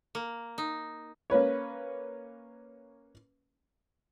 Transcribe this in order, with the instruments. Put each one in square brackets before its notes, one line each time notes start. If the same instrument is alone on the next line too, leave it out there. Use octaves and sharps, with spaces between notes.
[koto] A#3
D#4
[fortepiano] A#3 C#4 B4 C#5